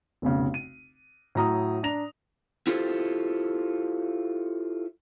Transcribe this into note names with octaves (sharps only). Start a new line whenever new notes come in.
F1 B1 C#3
D#7
A2 F#3 A#5 D#6
D4 A#5 A#6 F7
E4 F4 G4 A4 C5